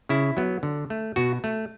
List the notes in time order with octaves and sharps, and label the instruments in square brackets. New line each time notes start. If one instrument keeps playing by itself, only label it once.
[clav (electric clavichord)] C#3 E4
F#3 B3
D3
A3
B2 F#4
A3